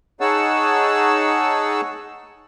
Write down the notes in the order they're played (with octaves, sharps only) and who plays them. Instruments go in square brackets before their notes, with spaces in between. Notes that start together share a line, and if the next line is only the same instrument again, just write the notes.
[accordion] D#4 G#4 C#5 F#5 A5 E6